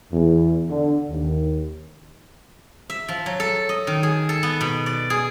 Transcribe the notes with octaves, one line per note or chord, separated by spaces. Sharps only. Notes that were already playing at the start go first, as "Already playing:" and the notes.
E2
D3
D#2
E5
F3
F#3
A4
D#5
D#3
G#4
A4
B3
B2
D5
G#4